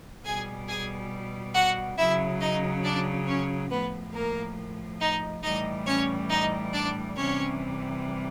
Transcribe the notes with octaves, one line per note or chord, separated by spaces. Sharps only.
B2 G3 G#4 G#5
G#4 G#5
F#4 F#5
C#3 F#3 E4 E5
D#4 D#5
D4 D5
C#4 C#5
A2 F3 B3 B4
A#3 A#4
D#4 D#5
A2 E3 G3 D#4 D#5
C#4 C#5
D#4 D#5
D4 D5
C3 E3 G3 C#4 C#5